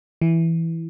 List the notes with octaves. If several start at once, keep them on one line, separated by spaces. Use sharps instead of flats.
E3